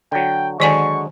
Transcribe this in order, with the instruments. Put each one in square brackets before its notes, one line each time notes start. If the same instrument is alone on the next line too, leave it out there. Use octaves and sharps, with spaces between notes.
[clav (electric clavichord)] D3 F#3 [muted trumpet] G5
[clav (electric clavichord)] D3 F#3 G#3 [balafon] D#3 D5 G#5 [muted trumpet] C#6